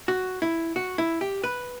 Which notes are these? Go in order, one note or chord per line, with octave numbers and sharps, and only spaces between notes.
F#4
E4
F#4
E4
G4
B4